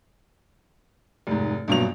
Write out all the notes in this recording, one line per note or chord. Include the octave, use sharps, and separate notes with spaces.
F1 G#2
A#1 G2 B2 F#3 F7